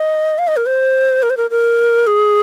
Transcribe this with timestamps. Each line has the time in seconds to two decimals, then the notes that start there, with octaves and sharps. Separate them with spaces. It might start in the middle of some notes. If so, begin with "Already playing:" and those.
Already playing: D#5
0.38 F5
0.48 D#5
0.57 A#4
0.66 C5
1.23 A#4
1.30 C5
1.37 A#4
1.50 A#4
2.07 G#4